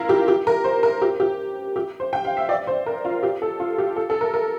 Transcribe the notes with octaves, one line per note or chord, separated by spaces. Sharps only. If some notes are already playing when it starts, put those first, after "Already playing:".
Already playing: E4 F4 A#4
G4
G4
A#4
C5
A#4
G4
G4
G4
C5
G5
F5
E5
D5
C5
A#4
F4
G4
A4
F4
G4
A4
A4
A#4
A#4